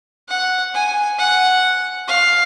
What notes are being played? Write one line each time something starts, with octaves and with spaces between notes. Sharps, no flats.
F#5
G#5
F#5
F5